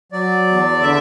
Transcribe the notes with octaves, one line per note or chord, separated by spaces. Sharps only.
F#3 D5
E2
D3 E5